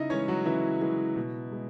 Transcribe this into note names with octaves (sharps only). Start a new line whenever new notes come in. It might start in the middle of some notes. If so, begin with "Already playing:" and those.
Already playing: C#3 D#4 E4 D#5 E5
E3 G#3 C#4 C#5
F#3 F#4
C#3 E3 E4
E3 G#3
B2
G#3